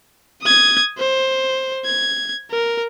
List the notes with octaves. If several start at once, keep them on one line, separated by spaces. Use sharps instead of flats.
D#6 G#6
C5
G#6
A#4